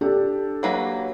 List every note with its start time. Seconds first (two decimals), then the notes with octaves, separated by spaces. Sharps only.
0.01 D4 G4 A4
0.63 F#3 A#3 B4